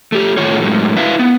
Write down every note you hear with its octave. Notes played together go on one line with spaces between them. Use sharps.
A3 G4
A2 D#3 A3 F4 C#5
A2 F#3 G#3
E4 B4 E5 F5
B3